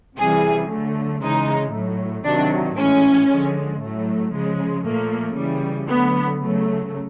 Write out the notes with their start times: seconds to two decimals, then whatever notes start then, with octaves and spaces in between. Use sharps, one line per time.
0.17 C3 E3 G3 G#4
0.69 D3 F#3 A3
1.21 C#3 E3 G#3 D#4
1.73 A2 F#3 A3
2.25 C3 D#3 F#3 D4
2.77 A2 E3 G#3 C#4
3.29 D3 F3 G#3
3.81 A2 F#3 A3
4.33 C#3 F3 G#3
4.85 A#2 F3 A3 A#3
5.36 C#3 E3 G3
5.89 D3 F#3 A3 B3
6.41 C#3 F#3 A3